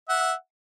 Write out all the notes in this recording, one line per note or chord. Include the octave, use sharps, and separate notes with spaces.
E5 F#5